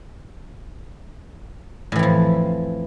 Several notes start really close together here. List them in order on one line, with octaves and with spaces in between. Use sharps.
A2 E3 F2 F3